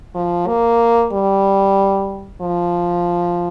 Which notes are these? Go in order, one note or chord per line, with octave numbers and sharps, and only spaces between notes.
F3
A#3
G3
F3